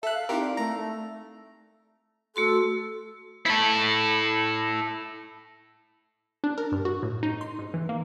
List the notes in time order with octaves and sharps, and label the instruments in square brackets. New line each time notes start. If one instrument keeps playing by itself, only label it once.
[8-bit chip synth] A4 F#6 [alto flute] E5
[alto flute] F5
[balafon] C4 D#4 E4 [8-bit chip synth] G4 A#4
[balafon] D5
[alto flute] A3 [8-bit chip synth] A#5
[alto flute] A3
[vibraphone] A3 F#4 C6 [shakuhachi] A4
[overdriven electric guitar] E4 A4
[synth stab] D4
A#4
G2
F#4
A2
D#4
C6
G#2
E3
A#3